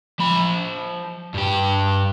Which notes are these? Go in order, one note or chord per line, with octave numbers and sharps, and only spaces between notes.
F3 B5
G2 G4